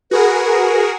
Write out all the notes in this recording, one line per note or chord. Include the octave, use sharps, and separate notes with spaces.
F#4 G#4 A#4 B4